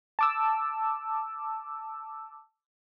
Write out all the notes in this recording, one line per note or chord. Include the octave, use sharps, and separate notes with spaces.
A5 D6 E6